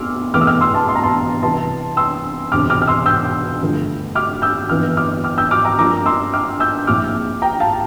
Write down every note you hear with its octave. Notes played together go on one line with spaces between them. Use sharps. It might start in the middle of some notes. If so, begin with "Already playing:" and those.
Already playing: E2 C3 A3 C6 D6 E6 F6
E1 E2 E3 A3 D6 F6
E6
D6 F6
C6 E6
A5 C6
C6
A#5
A5 C6
C2 C3 E3 A5 C6
C6 E6
E1 D2 C3 D6 F6
D6 F6
F6
C6 E6
E6 G6
G2 D3 F3 A3
D6 F6
E6 G6
G1 F2 E3 D6 F6
D6 F6
D6 F6
E6 G6
D6 F6
A#5 D6
G2 F3 A#3 D4 A#5 D6
C6 E6
D6 F6
E6 G6
A#1 A#2 F3 C4 E4 D6 F6
G5 A#5
F5 A5